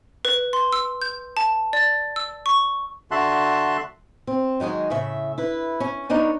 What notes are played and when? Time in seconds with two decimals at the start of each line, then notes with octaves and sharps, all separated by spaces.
0.25 B4
0.53 C6
0.72 E6
1.02 G6
1.37 A5
1.73 D5
2.16 E6
2.46 C#6
3.11 D3 F#4 E5 A5 C6 F#6
4.27 C4
4.60 D#3 F#3 G#3 G#4
4.90 A2 C#3 E5
5.38 E4 B4
5.80 C#4
6.09 B3 D4 D#4 A#4 C#5